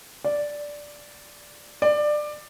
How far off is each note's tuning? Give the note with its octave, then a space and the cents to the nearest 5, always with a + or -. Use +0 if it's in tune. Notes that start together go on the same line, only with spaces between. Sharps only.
D5 -5
D5 +20